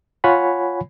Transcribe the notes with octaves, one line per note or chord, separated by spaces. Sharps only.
F4 C#5 F#5 G#5 B5